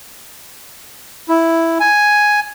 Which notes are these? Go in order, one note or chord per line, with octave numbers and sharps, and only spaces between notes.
E4
G#5